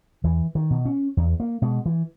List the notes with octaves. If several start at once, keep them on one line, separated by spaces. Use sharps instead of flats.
E2 E3
D#3
B2
C#4
E2
A#3
B2 G#3
E3